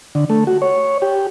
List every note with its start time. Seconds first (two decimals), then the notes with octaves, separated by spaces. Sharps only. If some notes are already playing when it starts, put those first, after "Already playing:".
0.15 D3
0.30 A3
0.47 F#4
0.62 C#5
1.02 G4